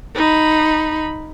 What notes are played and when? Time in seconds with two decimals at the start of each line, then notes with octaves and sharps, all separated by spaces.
0.15 D#4 B5